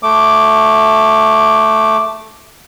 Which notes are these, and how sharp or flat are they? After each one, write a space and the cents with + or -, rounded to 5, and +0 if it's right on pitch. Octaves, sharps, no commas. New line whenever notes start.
A3 +0 D6 +0